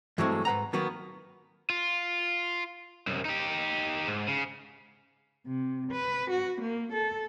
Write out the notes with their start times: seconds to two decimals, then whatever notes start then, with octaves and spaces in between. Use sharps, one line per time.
0.18 G2 E3 F#3 G#3 A3 C4
0.45 G#2 B4 F#5 A#5
0.73 D#3 F#3 A#3 B3
1.70 F4
3.07 C2 F#2
3.25 D#4 G4
4.08 G#2
4.28 C#3
5.47 C3
5.91 B4
6.30 F#4
6.61 A#3
6.93 A4